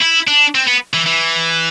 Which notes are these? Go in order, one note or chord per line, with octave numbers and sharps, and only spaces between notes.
E4
D4
C4
B3
E3
E3